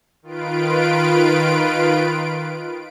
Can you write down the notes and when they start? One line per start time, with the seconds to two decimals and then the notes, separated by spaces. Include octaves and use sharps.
0.22 D#3 F4 B4 D7